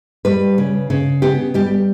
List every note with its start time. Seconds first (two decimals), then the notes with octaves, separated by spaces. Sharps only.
0.25 G3 B4
0.58 C#3
0.90 C#3
1.22 B3 G4
1.54 G3 G4